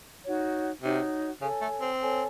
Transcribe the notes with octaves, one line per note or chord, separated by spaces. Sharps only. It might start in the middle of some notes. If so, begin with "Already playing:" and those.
D#4 F#4 C#5
C3 D#4 F#4 C#5
C#3 A4 C#5 G#5
A3
C4
A4 C#5 G#5